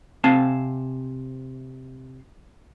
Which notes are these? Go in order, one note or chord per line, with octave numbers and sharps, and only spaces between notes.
C3 C4 F5 G#5 A5